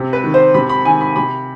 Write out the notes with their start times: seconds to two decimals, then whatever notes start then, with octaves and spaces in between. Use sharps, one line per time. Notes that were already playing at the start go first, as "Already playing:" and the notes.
Already playing: C3
0.13 B4
0.24 D#3
0.34 C5
0.54 C3 B5
0.69 B5
0.85 D#3 G#5
1.01 B5
1.16 C3 B5